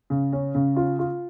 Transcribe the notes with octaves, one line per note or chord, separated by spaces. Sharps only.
C#3
C#4
C#3
F4
F4